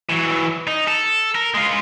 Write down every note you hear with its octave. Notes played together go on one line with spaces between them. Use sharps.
E3 F#3
D#4
A4
A#4
G#3 F4